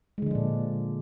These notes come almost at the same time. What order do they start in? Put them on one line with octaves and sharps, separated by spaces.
G#3 D3 F3 D4 A#2